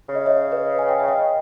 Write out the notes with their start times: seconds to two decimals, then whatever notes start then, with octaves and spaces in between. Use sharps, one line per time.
0.09 C#3
0.15 D#5
0.26 C#5 E5
0.52 B4 D#5
0.79 G#5
0.89 G5
0.99 E5
1.08 D#5 G5